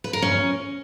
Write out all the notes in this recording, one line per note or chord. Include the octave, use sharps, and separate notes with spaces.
B4
A#4
C#4